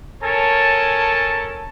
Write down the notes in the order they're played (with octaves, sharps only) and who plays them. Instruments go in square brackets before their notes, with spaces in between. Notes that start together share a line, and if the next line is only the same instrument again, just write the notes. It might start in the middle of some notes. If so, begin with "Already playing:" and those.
[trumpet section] C#4 A4 A#4 C#5 G#5 A5